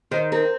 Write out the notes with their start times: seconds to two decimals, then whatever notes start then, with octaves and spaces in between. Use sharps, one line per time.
0.11 D#3 C5
0.32 C4 A#4